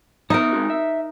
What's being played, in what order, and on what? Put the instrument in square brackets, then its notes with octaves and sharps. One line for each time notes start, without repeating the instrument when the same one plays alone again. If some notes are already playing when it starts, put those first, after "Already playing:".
[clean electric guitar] B3 E5 A#5 [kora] D#4 A#4
[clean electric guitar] G#3 C4 F#4
E5